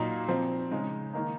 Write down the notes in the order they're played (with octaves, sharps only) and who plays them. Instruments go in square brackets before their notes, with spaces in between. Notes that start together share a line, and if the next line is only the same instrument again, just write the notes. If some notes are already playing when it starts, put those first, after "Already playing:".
Already playing: [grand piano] A#2 F#3 A#3 D#4
F3 C4 D#4
C#3 G#3 D#4
D#3 A#3 D#4